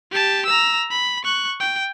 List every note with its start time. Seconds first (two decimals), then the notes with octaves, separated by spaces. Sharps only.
0.11 G4 A5
0.46 A#5 E6
0.91 B5
1.25 C#6 F#6
1.60 G5